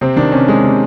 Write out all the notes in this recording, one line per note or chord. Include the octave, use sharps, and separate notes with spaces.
C3 C4
D#3 D4
C3 C#4
G#3
C3